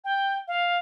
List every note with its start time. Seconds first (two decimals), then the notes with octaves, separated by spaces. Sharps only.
0.04 G5
0.48 F5